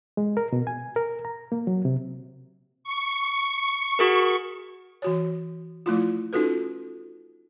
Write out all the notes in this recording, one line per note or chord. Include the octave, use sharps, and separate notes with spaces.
G#3
A#4
B2
G#5
A#4
A#5
A#3
F#3
C3
C#6
F#4 G#4 A#4
E3 F#4 C#5
F3 A3 E4 F4
C#4 D#4 F4 F#4 A4 B4